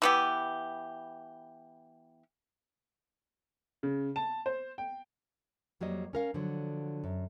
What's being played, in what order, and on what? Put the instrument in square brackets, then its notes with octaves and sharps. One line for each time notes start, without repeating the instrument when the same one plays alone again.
[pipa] E3 B3 G4
[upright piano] C#3
A5
C5
G5
[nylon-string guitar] F2 F#3 G3 A#3 D#5
C#4 A#4 F5
D3 F3 F#3
F#2